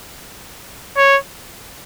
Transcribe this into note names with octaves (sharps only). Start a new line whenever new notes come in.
C#5